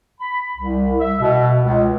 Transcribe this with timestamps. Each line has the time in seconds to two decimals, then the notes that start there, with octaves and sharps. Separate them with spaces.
0.20 B5
0.56 C2
0.99 E5
1.20 B2
1.61 C#2